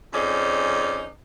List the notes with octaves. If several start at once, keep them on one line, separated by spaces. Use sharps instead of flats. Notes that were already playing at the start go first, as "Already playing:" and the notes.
F2 C#4 D#4 G#4 C5 D5